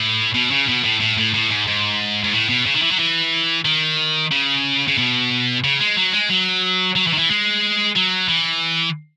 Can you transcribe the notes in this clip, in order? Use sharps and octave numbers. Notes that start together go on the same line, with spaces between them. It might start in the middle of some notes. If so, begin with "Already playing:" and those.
Already playing: A2
B2
C#3
B2
A2
A2
A2
A2
G#2
G#2
G#2
A2
B2
C#3
D#3
E3
F#3
E3
D#3
C#3
C#3
B2
C#3
G#3
F#3
G#3
F#3
F#3
E3
D#3
E3
G#3
F#3
E3